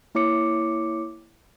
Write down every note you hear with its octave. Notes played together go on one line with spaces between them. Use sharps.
A#3 E4 C#5 D6 C#7